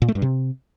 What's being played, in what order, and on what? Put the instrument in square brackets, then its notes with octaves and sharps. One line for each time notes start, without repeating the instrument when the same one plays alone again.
[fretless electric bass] A#2
A3
G2
C3